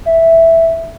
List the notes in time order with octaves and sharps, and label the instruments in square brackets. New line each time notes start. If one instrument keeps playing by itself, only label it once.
[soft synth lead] E5